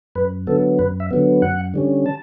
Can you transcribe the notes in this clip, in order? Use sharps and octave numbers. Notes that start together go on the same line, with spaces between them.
F#2 B4
D3 F#3 B3 A4
F#2 B4
E5
D3 F#3 B3
F#2 F#5
D3 G3 C#4
A5